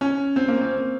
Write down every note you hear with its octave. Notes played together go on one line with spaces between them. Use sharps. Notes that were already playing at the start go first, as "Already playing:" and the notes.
C#4
C4
A#3
C4